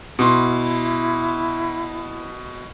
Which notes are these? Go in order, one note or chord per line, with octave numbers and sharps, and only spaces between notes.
B2 E4 C6